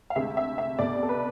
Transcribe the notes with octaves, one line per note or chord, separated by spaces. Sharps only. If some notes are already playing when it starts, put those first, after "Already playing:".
F5
D2 C3 G#3 E5
E5
E5
C2 B2 A3 D5
A4
B4